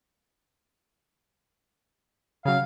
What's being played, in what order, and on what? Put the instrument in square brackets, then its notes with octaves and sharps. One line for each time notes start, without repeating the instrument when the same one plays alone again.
[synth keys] C#3 F#3 [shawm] F5